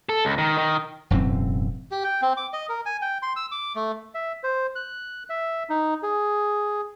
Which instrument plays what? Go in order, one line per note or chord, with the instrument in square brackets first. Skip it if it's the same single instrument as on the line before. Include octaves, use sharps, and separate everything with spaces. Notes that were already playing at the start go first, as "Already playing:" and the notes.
[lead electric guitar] A4
C#2
D#3
D#3
[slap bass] E1 F#2 A2 C4
[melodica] G4
G5
C4
D6
D#5
A#4
G#5
G5
C6
E6
D6
A3
[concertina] E5
C5
F#6
E5
D#4
G#4